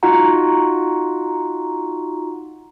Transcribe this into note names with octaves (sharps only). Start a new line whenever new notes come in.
D#4 F4 F#4 F#5 A#5